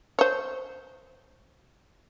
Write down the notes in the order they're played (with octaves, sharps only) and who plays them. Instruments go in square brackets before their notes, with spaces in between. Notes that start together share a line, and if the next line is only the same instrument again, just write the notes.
[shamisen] C5 C#5